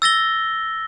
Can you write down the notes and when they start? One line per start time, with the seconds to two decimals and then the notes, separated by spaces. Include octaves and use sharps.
0.02 E6 A6 A#6 G7